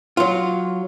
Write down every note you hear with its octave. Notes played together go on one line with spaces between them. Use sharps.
F#3 F4